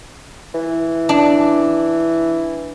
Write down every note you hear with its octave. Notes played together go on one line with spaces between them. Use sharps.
E3
D4